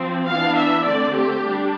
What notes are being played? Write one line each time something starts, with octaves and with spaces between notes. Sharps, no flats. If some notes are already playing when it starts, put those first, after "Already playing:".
Already playing: F3 C4
E3 B3 D4 F5
E5
D3 A3 C4 D5
G4
G3 D4